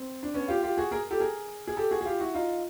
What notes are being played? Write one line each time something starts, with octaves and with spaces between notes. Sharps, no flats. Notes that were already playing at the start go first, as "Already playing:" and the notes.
Already playing: C4
D4
B3 C#4
F4 G4
F4 G4
F#4 G#4
G#4 A#4
G4 A4
G#4 A#4
G#4
G4 A4
F#4 G#4
G#4
F4 G4
E4 F#4
D#4 F4